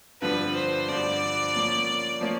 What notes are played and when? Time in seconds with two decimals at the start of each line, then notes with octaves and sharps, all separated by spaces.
0.21 G2 D3 F3 B4
0.55 C5
0.88 G2 D3 F3 D5
1.55 F3 A#3 C#4
2.21 F3 A#3 C#4